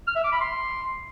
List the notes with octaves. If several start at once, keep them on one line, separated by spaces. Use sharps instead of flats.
F6
E5
D6
B5
C6